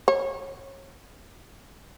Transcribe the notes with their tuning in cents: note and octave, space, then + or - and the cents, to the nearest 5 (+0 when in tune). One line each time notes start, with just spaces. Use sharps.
C#5 -25